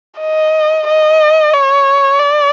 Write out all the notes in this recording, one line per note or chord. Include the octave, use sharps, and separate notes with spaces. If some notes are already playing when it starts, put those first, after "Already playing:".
D#5
D#5
C#5
D5